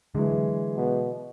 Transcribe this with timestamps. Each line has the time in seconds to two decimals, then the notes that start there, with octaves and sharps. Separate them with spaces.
0.15 D3 E3 F#3 G#3
0.76 B2